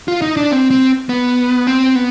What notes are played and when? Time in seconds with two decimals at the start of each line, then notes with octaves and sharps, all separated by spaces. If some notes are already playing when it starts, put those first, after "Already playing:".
0.08 F4
0.22 D#4
0.37 D4
0.51 C4
0.71 C4
1.09 B3
1.67 C4
1.96 B3